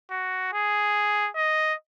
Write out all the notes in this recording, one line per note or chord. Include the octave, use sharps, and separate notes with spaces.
F#4
G#4
D#5